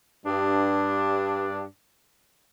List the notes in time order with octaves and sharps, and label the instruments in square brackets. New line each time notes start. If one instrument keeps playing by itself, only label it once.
[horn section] G2 D4